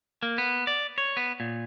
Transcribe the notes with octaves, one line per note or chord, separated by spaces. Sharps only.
A#3
B3
D5
C#5
B3
A#2